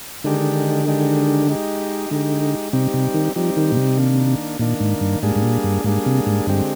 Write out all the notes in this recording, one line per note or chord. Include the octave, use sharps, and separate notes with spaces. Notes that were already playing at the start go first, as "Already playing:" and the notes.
D3 D#3 G#3 D4 G4
D#3 G#3 D4 G4
G#3 D#4 G4
D3 G#3 D#4 G4
C3 G3 C4 D#4 G4
C3
D#3
F3 G3 C4 D#4 G4
D#3
A#2
C3
D#3 A#3 D4
A#2 D#3 A#3 D4
G#2
G2
G#2 G3 A#3 D4 G#4
G#2
A#2
G2
G#2 G3 A#3 D4 G#4
C3
G#2
G2 D3 G#3 C4 G4